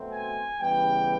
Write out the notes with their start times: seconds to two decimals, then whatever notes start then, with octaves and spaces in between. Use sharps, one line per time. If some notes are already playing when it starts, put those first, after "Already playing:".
Already playing: B2 F#3 A3 C4
0.09 G#5
0.60 C#3 E3 G3 B3 G5